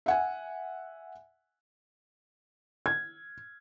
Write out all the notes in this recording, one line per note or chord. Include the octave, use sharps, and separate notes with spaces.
E5 F#5 G#5
G#6